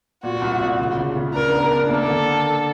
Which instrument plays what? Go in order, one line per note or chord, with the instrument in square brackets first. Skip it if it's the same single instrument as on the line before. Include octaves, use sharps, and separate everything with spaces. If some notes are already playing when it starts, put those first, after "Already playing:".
[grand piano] A#2 [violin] F#4
[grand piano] C2
A#2
C#3
C#3
C#3
[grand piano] D4 [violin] A#4
[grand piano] B3
D4
[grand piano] A#3 [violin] A4
[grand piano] D3